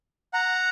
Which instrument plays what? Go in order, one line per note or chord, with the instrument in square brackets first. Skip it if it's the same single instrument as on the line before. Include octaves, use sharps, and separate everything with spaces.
[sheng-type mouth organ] F#5 A#5